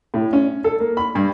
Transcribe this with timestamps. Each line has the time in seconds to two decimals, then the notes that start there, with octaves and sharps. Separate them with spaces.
0.14 A2
0.33 C#4
0.64 A4
0.80 A#3
0.97 B5
1.15 G2